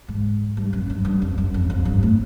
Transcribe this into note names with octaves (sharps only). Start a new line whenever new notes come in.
G#2
G2
F#2
G2
G2
F2
F#2
F2
F2
G2
A2